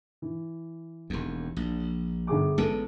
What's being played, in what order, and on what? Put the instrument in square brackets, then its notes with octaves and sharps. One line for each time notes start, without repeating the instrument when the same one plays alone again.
[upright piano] E3
[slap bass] E1 D#2
A#1
[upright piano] G1 G#4 D6
[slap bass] A1 G#3 B3 [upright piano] A4 D7